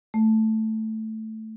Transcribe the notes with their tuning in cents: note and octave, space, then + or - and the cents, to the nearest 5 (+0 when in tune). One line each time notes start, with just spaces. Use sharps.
A3 +0